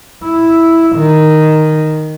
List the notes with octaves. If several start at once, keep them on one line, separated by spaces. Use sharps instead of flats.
E4
D#3